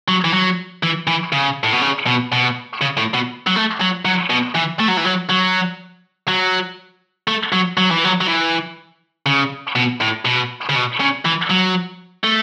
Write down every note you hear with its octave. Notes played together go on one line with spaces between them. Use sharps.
F#3
E3
F#3
E3
E3
C#3
A2
B2
C#3
B2
B2
C#3
A2
B2
F#3
A3
F#3
F#3
B2
E3
A3
F#3
E3
F#3
F#3
F#3
A3
F#3
F#3
E3
F#3
F#3
E3
C#3
B2
A2
B2
C#3
B2
C#3
E3
F#3
A3